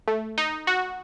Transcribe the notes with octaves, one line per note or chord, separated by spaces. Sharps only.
A3
D#4
F#4